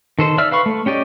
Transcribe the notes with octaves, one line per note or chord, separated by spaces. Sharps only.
D#3 A4 C5
D5 E5 E6 F6
B4 F5 B5 C#6
A3
C#4 G4 D5 D#5